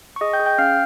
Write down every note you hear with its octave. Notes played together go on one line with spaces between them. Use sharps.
C#6
G#4 D#5 D#6
G5 G6
G#4
G5 G6
C#4 F5 F6